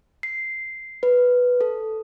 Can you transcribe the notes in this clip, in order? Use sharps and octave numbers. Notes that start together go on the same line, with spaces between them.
C7
B4
A4